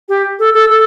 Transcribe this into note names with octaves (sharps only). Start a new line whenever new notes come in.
G4
A4
A4
A4